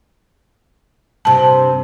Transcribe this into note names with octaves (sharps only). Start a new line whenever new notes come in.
G2 C3 A5